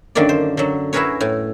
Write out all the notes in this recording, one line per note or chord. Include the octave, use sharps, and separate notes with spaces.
F#2 D3 D#3 A#3 D5
C5
D3 F#3
E4 F#4 G#4 A#4 B4 C#5
A2